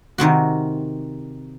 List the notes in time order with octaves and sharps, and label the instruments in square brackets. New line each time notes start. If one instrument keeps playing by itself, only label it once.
[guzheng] C3 D#3 C4 F#4